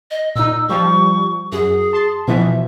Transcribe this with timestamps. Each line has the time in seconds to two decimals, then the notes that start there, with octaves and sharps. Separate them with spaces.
0.11 D#5
0.36 A#2 D#4 E6
0.69 F3 G3 C#6
1.52 F#2 G#4
1.93 A5 C6
2.28 B2 E3 F3 E5